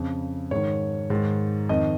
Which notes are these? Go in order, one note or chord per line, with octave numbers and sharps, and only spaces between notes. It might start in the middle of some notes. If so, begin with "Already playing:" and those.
Already playing: F2 C#3
G#2 D#3 C#5
G#2 D#3
F2 D#3 D#5